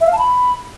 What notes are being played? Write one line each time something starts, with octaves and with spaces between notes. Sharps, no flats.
E5
F5
A5
B5